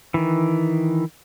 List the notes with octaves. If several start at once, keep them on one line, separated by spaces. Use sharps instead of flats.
D#3 E3